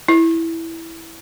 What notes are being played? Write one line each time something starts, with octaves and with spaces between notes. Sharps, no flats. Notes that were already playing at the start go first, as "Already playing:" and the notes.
E4